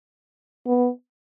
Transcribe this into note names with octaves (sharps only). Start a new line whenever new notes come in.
B3